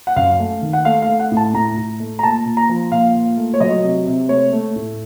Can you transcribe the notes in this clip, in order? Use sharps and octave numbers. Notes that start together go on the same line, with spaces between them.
F#5
F#2 F5
A3
D#3
F#5
A3 F5
F5
A3
F#5
A2
A5
A2 A#5
A2
A3
A#5
A#2 A5
A#2
A#5
F3
A#2 F5
A#2
A3
C#5
F#3 D#5
C3
C3
A3 C#5
A3
A2